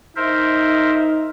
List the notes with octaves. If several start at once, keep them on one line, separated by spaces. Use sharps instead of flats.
D#4 A#4 C5 E5